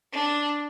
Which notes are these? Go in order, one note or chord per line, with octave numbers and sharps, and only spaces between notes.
D4